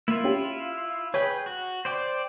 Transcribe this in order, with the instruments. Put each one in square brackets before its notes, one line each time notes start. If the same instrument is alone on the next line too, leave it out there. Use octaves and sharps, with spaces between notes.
[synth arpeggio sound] A#3 [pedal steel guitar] E4 F4
[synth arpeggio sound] C#4 G4
[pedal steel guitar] G#4 B4 G5 [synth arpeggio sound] C#5
[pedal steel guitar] F#4
C5 D5 G5